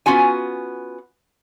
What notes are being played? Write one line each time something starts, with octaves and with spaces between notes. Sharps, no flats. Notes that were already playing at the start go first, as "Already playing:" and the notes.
B3 C#4 F4 F#4 G#5